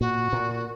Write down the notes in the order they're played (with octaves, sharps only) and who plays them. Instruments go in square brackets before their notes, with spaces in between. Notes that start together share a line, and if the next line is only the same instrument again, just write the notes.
[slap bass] A#2 [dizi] F#4
[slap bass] A#2